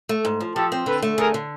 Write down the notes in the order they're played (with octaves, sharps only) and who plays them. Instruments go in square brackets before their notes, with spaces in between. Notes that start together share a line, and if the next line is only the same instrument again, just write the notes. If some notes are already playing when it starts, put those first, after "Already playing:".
[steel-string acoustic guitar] A3
G#2
F3
[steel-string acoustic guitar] F3 [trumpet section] G4 A4
[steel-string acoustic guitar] C4
[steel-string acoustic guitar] D3 [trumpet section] A4 B4
[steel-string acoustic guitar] A3
[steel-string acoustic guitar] D3 [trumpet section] G#4 A#4
[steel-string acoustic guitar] D3